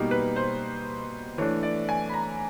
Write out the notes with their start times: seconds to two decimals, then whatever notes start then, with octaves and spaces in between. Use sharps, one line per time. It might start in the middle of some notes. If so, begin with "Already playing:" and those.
Already playing: B2 G3 A#3 D#4
0.11 B4
0.36 C5
1.38 E3 A3 D4 C#5
1.63 D5
1.89 G#5
2.09 B5
2.14 A#5